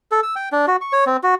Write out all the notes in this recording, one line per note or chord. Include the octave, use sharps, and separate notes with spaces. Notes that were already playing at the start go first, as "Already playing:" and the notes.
A4
E6
G5
D4
F#4
C#6
C#5
C4
F#4